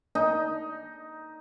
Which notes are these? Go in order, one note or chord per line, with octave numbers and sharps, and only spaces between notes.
D#4